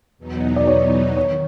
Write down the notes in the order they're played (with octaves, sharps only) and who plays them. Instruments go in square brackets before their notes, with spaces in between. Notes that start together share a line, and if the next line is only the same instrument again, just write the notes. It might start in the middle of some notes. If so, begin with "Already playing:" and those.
[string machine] E2 B2 F#3 B3 D#4
[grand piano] D5
C#5
[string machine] D#3 [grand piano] C#5